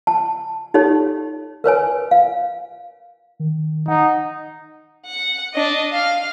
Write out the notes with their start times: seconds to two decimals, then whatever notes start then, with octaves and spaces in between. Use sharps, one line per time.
0.07 A5
0.74 D#4 G4 A4 C#5
1.64 A#4 B4 C#5 G#5
2.11 F5
3.40 D#3
3.88 D#4 F#5
5.06 F#5
5.54 D4 D#5
5.91 F5 F6